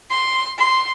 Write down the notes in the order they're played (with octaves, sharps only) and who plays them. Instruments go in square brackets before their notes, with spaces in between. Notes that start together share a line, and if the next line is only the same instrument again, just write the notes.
[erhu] C6
C6